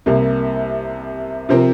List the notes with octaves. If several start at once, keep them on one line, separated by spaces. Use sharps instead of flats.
C2 C3 A#3
C3 F3 C4 A#4